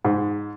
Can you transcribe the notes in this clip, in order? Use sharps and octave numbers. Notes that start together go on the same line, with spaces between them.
G#2